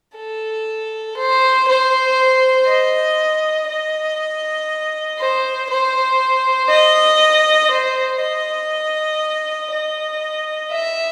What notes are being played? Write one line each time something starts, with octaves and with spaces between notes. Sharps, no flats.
A4
C5
C5
D#5
D#5
C5
C5
D#5
C5
D#5
D#5
E5